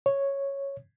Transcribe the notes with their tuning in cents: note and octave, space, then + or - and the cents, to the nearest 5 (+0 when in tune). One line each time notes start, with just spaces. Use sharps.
C#5 -5